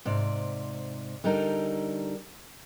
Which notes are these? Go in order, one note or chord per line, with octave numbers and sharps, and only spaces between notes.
G#2 C3 D5
D3 G3 D#4 A#4